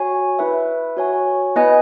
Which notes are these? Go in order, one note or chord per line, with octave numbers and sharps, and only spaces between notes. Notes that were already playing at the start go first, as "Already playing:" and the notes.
Already playing: F#4 C#5 G#5
E4 B4 E5
F#4 C#5 G#5
B3 E4 B4 D#5 G#5